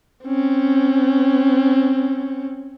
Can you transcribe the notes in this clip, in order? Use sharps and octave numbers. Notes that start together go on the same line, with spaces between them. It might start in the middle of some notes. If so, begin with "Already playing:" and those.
C4 C#4